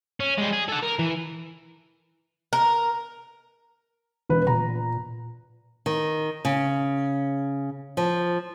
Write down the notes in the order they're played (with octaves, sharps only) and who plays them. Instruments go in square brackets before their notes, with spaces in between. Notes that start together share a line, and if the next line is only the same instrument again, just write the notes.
[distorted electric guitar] C#4
G3 G#3
G#4
A4 F#5
A#4
E3
[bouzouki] A#4
[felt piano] E1 B4
[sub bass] A#2 [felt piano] A#5
[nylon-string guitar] D#3
C#3
F3